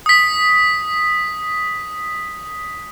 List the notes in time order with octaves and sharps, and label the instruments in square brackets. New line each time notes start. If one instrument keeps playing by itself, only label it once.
[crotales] D#6 B6